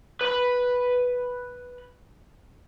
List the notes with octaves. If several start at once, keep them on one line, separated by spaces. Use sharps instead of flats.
B4 B5